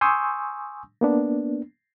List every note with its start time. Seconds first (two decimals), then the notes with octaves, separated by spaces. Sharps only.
0.01 G#5 C6 C#6 D#6 E6 G6
1.01 A#3 B3 D4